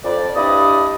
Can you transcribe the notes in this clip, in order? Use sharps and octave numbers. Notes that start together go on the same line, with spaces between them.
F2 D5
G2 G3 E4 D5 D#5 D#6